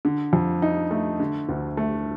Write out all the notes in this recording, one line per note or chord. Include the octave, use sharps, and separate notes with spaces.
D3
F2
D#4
A3
D3
D2
A3